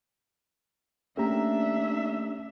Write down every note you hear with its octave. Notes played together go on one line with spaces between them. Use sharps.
A3 A#3 C#4 D4 G4 E5 A#5